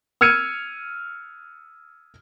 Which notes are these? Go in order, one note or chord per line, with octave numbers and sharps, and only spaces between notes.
E6 F6 G#6 C#7 D#7